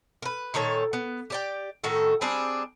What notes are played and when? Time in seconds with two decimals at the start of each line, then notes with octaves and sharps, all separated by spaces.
0.22 A#4 B4
0.54 A#2 D#3 A4 C#5
0.93 B3
1.30 G4 D5 G5
1.84 A2 D#3 F#4 A4
2.21 G3 C4 D4 G#4